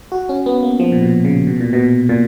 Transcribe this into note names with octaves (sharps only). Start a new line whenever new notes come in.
F#4
C#4
B3
A#3
F3
A#2
B2
C#3
B2
A#2
B2
A#2